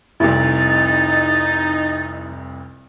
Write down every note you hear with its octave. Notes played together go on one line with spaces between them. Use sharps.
F1 C2 D#4 E4 A6